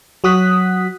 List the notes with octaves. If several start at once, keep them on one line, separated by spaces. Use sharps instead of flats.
F#3 F#4 D#6 F#6 B6